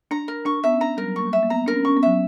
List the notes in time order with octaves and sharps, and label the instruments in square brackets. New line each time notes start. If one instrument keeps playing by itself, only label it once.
[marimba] D4 [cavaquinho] A#5
[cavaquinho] A#4
[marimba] D4 [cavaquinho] C#6
[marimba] B3 [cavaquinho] E5
[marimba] C#4
[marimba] D4 [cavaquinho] A#5
[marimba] G3 [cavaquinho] A#4
[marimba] F#3
[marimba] A#3 [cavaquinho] C#6
[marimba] G3
[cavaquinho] E5
[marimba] A#3
[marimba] B3 [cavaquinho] A#5
[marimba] D4 [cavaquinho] A#4
[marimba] C#4
[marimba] C#4 [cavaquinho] C#6
[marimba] B3
[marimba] F#3 [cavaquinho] E5